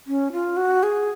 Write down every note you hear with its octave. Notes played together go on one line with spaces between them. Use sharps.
C#4
F4
F#4
G#4